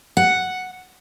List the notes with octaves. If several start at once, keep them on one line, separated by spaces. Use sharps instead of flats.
F#5